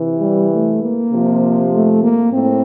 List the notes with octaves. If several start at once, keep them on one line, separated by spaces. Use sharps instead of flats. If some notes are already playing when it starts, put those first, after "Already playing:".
Already playing: C3 E3
G3
A3
A#3
C3 F3
A3
A#3
A2 C4